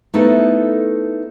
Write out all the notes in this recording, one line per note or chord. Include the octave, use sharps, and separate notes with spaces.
A3 B3 D#4 E4 A4 C5